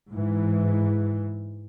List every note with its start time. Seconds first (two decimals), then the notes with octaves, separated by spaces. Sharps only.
0.11 G#2 E3